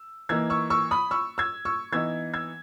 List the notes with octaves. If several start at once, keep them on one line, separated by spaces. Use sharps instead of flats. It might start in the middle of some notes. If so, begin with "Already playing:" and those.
Already playing: E6
E3 A#3 D#4 E6 G#6
C#6 E6
C#6 E6
B5 D#6
C#6 E6
E6 G#6
C#6 E6
E3 B3 D#4 E6 G#6
E6 G#6